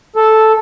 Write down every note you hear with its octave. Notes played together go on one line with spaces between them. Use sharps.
A4